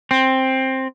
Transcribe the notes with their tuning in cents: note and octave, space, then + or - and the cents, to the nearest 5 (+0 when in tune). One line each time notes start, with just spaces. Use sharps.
C4 +10